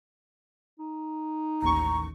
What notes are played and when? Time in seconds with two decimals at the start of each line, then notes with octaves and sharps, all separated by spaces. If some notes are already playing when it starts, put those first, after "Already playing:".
0.79 D#4
1.62 A1 D#2 A#5 C#6